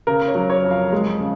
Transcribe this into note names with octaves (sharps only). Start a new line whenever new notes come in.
C#3 A#4
C#5
F#3
C#5
F2
F5
G#3
C#3